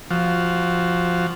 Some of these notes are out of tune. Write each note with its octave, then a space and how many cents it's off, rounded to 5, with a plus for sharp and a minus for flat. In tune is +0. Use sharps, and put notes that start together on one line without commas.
F3 +0 F#4 +10